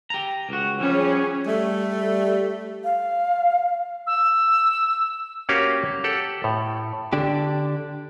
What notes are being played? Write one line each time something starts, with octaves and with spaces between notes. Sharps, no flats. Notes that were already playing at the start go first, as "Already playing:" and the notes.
G4 A#5
C#2 F#4
F3 G3 C#4 G#4
G3 A3
F5
E6
A#3 C#4 F#4 G4 F5
G4 A4 F#5
A2
D3 D4 G4